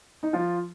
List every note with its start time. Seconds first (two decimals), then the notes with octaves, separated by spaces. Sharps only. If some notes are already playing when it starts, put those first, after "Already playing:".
0.23 D#4
0.33 F3 F4